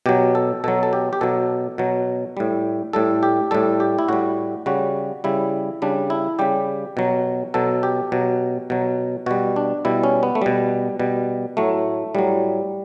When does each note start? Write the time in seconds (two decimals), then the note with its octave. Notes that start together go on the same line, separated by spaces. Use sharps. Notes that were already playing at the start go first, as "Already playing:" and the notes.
0.06 B2 F#3 G4
0.35 A4
0.64 B2 F#3 A4
0.83 A4
0.93 G4
1.13 G4
1.21 B2 F#3 A4
1.78 B2 F#3
2.37 A2 G3
2.93 A2 G3 A4
3.23 G4
3.51 A2 G3 A4
3.80 G4
3.99 E4
4.08 A2 G3 F#4
4.66 C#3 G3 F#4
5.24 C#3 G3 E4
5.82 C#3 G3 D4
6.10 E4
6.39 C#3 G3 G4
6.97 B2 F#3
7.54 B2 F#3 A4
7.83 G4
8.12 B2 F#3
8.70 B2 F#3
9.26 B2 G3 F#4
9.56 D4
9.85 B2 G3 E4
10.03 C#4
10.23 B3
10.35 A3
10.42 B2 G3
11.00 B2 G3
11.57 A2 F#3 A3
12.15 A2 F#3 G3